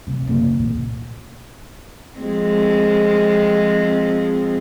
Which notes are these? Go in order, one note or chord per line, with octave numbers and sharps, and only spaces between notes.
C3
F#1 C3
E2 A#2
F3 G#3 C4